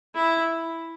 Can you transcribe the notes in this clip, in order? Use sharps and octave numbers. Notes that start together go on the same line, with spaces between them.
E4